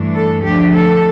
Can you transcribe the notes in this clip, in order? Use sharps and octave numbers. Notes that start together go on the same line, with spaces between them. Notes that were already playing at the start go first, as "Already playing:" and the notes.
Already playing: G2 E3 A3 D4
A4
D2 D3 F3 A3 D4 G4
A4